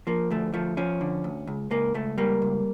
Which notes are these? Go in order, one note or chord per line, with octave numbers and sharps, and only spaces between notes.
F3 A#3
D2 A3
F3 A3
F3 C#4
D3
D2
C#2
C#2 A#3
C#2 A3
G3 A#3
C#2